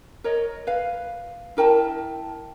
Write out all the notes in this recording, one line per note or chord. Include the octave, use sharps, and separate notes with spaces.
A#4 C#5 D#5
B4 F5
E4 A#4 G5 A5